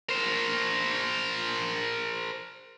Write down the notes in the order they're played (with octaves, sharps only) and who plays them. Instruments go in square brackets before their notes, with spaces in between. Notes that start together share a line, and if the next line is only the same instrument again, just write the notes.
[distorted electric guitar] A#4 C5